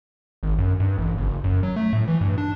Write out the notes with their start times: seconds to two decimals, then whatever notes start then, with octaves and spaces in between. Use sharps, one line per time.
0.43 G#1
0.58 F#2
0.80 G2
0.98 A1
1.18 F#1
1.44 F#2
1.63 F#3
1.76 A3
1.93 A2
2.08 E3
2.21 G2
2.38 D4